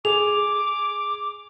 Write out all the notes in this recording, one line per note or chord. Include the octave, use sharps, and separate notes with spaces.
G#4 D6 F7